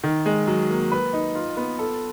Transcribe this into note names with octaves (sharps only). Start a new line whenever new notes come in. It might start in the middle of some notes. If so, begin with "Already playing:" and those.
D#3
G#3
F#3
A#3
B4
D#4
F4
B3
A4